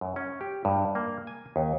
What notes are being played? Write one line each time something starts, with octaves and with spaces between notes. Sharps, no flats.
F#2
C#4
G4
G2
A#3
G#5
D#2